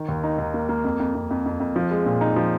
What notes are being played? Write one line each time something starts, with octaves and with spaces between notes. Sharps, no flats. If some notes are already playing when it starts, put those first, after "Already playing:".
Already playing: D#3
D#2
D#4
D#2
A#3
A#3
F2
F2
F2
F2
F2
F2
F3
G#3
A#2
D#4
F3